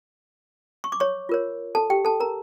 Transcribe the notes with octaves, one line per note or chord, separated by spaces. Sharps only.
C#6
D6
C#5 C#6
F4 A#4 C#5
A4 A5
G4 G5
A4 A5
A#4 A#5